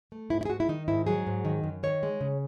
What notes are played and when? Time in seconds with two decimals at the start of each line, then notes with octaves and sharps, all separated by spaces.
0.12 A3
0.30 G#2 E4
0.41 E4
0.45 G#4
0.49 G#2 F#4
0.60 E4
0.68 D#3 D#4
0.88 G#2 E4
1.07 F#3 G#4
1.27 G#2
1.45 D#3
1.64 F#2
1.83 D#3 C#5
2.03 G#3
2.21 C#3